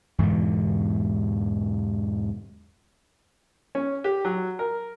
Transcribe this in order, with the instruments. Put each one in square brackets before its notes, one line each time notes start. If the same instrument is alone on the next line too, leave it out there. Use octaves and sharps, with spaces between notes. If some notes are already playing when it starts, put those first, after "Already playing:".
[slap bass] E2 G#2 B2 D3
[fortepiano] C#4
G4
F#3
A#4